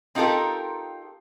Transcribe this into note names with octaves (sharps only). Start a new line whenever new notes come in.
C4 D#4 F4 G4 A4 A#4